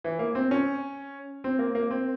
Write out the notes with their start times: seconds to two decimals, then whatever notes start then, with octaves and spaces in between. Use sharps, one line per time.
0.04 E3
0.19 A#3
0.35 C4
0.51 C#4
1.44 C4
1.59 A#3
1.75 A#3
1.91 C4